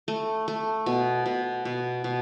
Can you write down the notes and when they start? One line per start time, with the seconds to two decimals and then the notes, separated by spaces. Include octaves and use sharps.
0.08 A3
0.48 A3
0.86 B2
1.26 B2
1.65 B2
2.04 B2